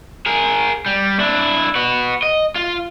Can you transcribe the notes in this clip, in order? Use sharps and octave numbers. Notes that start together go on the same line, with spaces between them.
G#4 A#4
G3
D4 E4
F#4 B4
D#5
F4